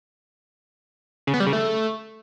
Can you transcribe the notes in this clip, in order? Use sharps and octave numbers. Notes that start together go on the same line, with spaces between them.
C#3
B3
G3
C#3
A3